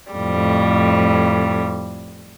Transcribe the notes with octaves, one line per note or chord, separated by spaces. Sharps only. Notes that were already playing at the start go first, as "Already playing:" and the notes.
F2 A2 G3